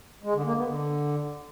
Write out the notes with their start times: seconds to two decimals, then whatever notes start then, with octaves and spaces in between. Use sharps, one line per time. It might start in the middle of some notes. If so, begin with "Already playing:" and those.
0.23 G#3
0.34 D3
0.45 A#3
0.56 B3
0.67 D3